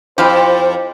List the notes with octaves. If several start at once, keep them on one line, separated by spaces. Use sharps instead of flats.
F2 E4 F4 G4 C5